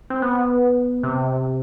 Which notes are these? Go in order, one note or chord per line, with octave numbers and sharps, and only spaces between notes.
C4
B3
C3